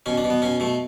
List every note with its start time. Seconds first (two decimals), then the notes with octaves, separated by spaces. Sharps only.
0.06 B2 C#4
0.17 D4
0.24 B2
0.30 B3
0.42 B2 C#4
0.60 B2 A3